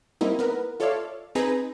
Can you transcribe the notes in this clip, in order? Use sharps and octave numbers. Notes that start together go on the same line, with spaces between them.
G3 A#3 C4 D#4 E4
B3 A#4 B4
F4 A4 C#5 D5 E5 F5
C4 D#4 G#4 B4 G#5 A#5